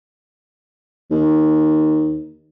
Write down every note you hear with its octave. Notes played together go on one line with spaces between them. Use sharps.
D#2